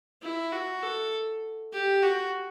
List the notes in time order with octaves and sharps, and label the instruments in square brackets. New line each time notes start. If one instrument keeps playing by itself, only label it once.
[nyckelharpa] E4
F#4
A4
G4
F#4